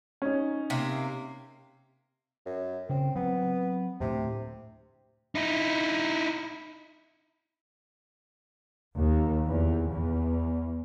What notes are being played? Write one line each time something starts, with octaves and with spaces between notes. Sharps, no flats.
C#4 D#4
C3 A#3
F#2
C#3 C4
F#3 B3 C4
D2 A2 C3
D#4 E4
D#2
E2
E2